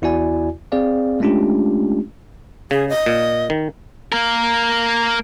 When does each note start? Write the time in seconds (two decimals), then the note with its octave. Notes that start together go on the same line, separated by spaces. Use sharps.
0.02 E2 E4 F#4 D5 G#5
0.72 C4 G#4 D5 F5
1.20 G#3 A3 C#4 D4 F4 G4
2.71 C#3 G#4
2.89 D#5
3.06 A#2
3.50 D#3
4.12 A#3 A#4